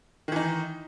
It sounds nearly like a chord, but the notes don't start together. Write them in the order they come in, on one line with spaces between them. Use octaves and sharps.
D#3 E3 D#4